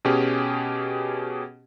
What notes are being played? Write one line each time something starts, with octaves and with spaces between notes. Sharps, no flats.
B2 C#4 G4 G#4